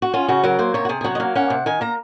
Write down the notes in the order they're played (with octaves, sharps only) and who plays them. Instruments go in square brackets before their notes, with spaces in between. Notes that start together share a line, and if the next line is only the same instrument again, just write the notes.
[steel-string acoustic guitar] F#4
C#4 F4
C#3 F#4
F#3 A#4
A#3 C5
C3 C#5
F#4
C3 G#4
G#4
F#3 F#4
D#5
A#3 F5
C#4 F#5
C3
D#3 G#5
A#3 A#5